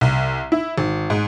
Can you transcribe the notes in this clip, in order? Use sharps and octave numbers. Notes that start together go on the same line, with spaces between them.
C2
E4
G#1
G#2